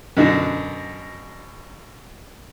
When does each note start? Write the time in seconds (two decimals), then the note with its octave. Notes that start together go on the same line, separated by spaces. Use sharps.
0.17 F#2 B2 D3